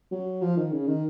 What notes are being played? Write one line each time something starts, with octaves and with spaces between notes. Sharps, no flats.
F#3
F3
D#3
C#3
D#3